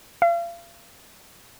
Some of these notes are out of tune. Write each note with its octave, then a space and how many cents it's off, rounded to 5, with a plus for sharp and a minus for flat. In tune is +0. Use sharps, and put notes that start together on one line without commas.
F5 -40